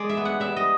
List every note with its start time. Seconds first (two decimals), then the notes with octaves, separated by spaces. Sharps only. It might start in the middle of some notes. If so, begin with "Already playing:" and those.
Already playing: G#3 D5
0.09 E5
0.17 B3
0.25 F#5
0.40 G3 E5
0.56 D#5